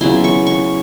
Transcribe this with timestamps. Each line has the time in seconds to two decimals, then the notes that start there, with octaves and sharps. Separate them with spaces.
0.01 C#3 F#3 B3 E4 C6
0.24 C#6
0.47 C#6